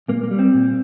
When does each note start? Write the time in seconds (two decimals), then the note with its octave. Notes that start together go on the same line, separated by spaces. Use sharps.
0.08 A#2 A#3
0.23 A#3
0.31 G3
0.39 C4
0.54 A#2